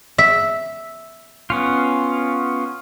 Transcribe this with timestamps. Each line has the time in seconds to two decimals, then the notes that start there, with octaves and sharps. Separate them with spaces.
0.18 E5
1.50 B3 C#4 F4